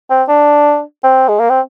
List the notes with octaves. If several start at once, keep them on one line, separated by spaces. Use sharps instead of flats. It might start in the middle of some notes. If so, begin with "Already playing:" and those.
C4
D4
C4
G#3
A#3
C4